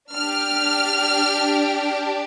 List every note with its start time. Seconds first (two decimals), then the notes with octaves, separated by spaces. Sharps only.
0.14 D4 G4 F6